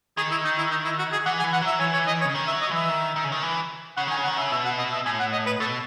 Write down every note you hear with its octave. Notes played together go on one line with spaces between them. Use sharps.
D#3 G#4
E4
D#4
E4
D#4
E4
F#4
G#4
E3 F#5
G#5
E3
F#5
F#3 E5
E3 C#5
C#5
D#5
C#5
C#3
D#3
E5
F#3
D#5
E3 E5
D#3
D#3
C#3
D#3
E3
C#3 F#5
D#3 G#5
C#3
F#5
D#3
C#3 E5
B2 E5
F#5
D#5
E5
A2 G#5
F#5
D#5
B4
B2 A4